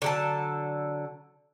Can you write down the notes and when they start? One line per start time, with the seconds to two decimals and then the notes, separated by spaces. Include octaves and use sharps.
0.02 D3 F#3 A5